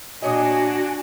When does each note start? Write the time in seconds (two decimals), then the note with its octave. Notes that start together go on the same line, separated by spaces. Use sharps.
0.22 A#2 D4 F#4 C#5 D#5 G#5